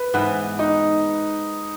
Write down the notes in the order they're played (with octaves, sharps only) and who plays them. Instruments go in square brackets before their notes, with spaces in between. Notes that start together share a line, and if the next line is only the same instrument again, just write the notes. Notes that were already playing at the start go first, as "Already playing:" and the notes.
Already playing: [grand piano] B4
[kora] G#2 E3 B3
[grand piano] D#4